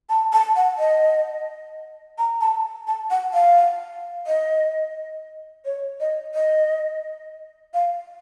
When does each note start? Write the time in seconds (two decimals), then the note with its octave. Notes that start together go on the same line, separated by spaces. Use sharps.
0.10 A5
0.33 A5
0.56 F#5
0.79 D#5
2.18 A#5
2.41 A5
2.87 A5
3.11 F#5
3.34 F5
4.27 D#5
5.65 C#5
6.00 D#5
6.35 D#5
7.74 F5